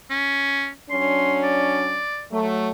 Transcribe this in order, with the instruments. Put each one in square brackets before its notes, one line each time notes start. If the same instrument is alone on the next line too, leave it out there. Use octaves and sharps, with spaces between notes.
[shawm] C#4
[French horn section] F#3 C#4 D4 [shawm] C6
[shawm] D5
[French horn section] F#3 A3